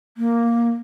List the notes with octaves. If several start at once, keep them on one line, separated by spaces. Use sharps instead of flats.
A#3